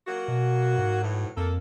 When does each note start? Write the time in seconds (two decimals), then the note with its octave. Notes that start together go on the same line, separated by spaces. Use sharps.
0.07 F#3 A#3 F#4
0.28 B2
0.78 G#2
1.02 A2 E3 F#3
1.37 F2 A#3 A4